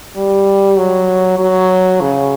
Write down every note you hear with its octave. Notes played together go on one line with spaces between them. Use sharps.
G3
F#3
F#3
C#3